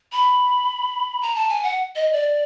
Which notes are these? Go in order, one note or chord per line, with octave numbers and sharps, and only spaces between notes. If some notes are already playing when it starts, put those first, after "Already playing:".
B5
A#5
A5
G#5
F#5
D#5
D5